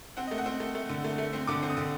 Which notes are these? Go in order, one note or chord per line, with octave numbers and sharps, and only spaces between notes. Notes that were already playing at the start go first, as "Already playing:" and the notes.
C4 F#5
D#5
A3
F#5
C4
A3
A3
D3
A3
A3
C4
D3 D6
C4
D#6
D3